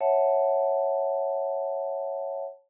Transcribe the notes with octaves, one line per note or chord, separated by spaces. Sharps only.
C#5 E5 F#5 A5